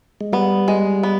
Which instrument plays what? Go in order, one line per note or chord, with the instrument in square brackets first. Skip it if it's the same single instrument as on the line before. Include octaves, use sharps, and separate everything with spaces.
[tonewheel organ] G#3
[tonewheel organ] G3 [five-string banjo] B3
[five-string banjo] G#3
B3